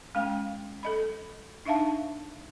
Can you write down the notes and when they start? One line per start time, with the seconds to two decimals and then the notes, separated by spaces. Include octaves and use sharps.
0.15 G#3 C#4 F5 G5
0.83 A4 D#5 B5
1.65 D4 D#4 E5 F5 A5